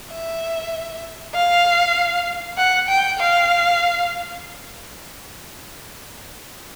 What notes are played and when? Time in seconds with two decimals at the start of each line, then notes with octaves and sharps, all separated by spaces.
0.12 E5
1.35 F5
2.57 F#5
2.89 G5
3.19 F5